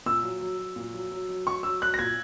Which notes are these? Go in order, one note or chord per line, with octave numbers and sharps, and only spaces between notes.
A#2 E6
F#3
F#3
F#3
A#2
F#3
F#3
F#3
F#3 C#6
F#3 E6
F#3 F#6
A#6
A#2 G#6